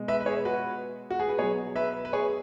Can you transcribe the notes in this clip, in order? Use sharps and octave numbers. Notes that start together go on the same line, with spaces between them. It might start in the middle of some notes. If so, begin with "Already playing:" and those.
Already playing: B2 G#3
B4 E5
B4
G#4 C#5
F#4 B4
F#4
G#4
B4
B2 F#3 G#4 C#5
B4 E5
B4
G#4 C#5